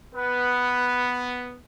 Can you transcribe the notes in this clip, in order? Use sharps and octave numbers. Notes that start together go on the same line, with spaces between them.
B3 B4